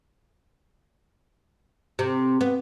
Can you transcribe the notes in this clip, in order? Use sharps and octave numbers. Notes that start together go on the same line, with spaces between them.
C3
B3